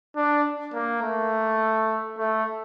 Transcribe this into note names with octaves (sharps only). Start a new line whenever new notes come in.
D4
A#3
A3
A3